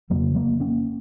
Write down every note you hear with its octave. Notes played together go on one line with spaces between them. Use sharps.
F2 C#3 F#3 A#3
F#3 A#3
A#3 C#4